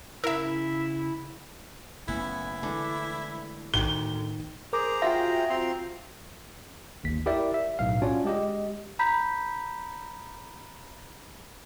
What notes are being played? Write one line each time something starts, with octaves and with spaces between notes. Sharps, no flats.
C#3 E4 A#4 E5 E6
F#1 A3 B3 C#4 E4
D3 E3 G#3 A3 D4
D2 A2 D#3 G7
G#4 A#4 C5 A#5 D6
F4 F#4 E5 G5 A#6
C4 A#5 C6
G1 D#2 B6
E4 G4 A#4 D5 E5
E5
B1 A2 F5
C#4 D4 F4 F#4 C#5 D5
G#3 G4 D#5
A#5 B5 G6 B6